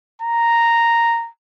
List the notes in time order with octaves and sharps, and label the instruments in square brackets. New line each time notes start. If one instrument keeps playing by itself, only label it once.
[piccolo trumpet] A#5